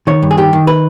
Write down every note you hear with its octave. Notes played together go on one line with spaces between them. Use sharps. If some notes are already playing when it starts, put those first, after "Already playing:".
D#3 C#5
G2
G#4
D#3 G4
D#3
B4